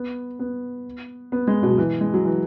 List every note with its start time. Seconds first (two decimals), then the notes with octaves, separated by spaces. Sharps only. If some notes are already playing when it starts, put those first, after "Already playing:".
Already playing: B3
0.39 B3
1.32 B3
1.48 G#3
1.63 B2
1.70 F#3
1.78 E3
2.01 G#3
2.14 F#3
2.25 E3